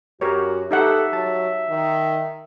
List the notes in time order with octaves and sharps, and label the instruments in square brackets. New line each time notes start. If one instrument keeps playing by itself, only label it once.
[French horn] F#2 [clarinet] F#4 [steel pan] G4 A#4 C#5
[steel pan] D#4 G4 F#5 [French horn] A4 [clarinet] E5
[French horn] F#3 [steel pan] A5
[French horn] D#3